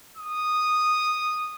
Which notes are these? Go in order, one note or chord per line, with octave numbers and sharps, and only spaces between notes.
D#6